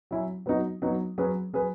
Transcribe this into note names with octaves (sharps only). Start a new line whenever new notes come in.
F#3 C#4 E4
F#3 B3 D#4 F#4
F#3 B3 D#4 F#4
F#3 C#4 G#4 B4
F#3 C#4 G#4 B4